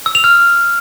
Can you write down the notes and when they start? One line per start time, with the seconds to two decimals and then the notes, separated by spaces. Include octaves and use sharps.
0.06 E6
0.15 F7
0.24 F6